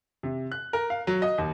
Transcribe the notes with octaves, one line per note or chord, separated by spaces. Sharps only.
C3
F#6
A#4
F5
F#3
D#5
D#2